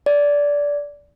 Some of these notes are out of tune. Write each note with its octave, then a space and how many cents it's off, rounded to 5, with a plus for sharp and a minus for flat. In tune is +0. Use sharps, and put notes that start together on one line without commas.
D5 -15